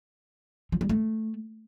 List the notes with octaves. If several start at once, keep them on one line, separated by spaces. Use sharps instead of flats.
F3
G3
A3